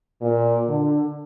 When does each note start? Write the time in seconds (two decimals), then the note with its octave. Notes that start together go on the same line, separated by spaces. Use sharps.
0.22 A#2
0.68 D3